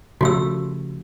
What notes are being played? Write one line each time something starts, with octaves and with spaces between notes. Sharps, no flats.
C#3 F3 A3 F#4 G4 E6